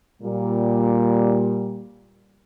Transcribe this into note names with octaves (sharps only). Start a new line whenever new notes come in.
A#2 G3